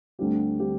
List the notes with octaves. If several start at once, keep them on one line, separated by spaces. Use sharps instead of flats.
D2 D3 G3 C4 G4
D3 G3 C4 G4